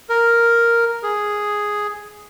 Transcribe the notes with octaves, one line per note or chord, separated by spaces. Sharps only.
A#4
G#4